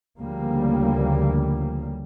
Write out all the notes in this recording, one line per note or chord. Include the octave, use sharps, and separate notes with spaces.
D2 C#3 F3 G3 A#3